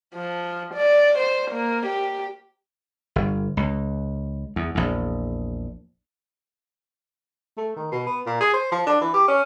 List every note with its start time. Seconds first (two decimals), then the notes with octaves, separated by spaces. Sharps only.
0.15 F3
0.74 D5
1.18 C5
1.51 A#3
1.86 G4
3.16 G1
3.57 C#2
4.56 E2
4.75 A#1 E2
7.57 A3
7.76 D#3
7.91 B2
8.06 B3
8.26 A#2
8.41 G#4
8.53 C5
8.71 F3
8.86 D4
9.01 E3
9.14 G4
9.28 C#4